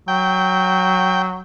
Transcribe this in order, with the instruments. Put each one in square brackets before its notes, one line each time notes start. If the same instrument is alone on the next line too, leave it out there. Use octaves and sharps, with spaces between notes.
[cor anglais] F#3 [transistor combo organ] G5